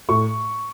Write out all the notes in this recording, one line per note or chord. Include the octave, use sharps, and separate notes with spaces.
A2 C#6